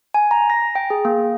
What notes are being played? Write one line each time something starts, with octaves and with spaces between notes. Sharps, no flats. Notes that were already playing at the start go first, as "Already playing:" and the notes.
G#5
A#5
A#6
G5
G#4
A#3